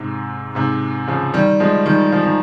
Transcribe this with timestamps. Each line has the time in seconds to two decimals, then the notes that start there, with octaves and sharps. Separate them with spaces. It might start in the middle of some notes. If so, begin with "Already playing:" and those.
Already playing: G#2 C3
0.55 G#2 C3
1.08 C#3 F3
1.33 D#3 G3
1.60 F3 G#3
1.86 D#3 G3
2.12 F3
2.23 D#3